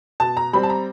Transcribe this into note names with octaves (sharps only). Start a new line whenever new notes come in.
B2 A5
A#5
G3 C4 B5
A5
A#5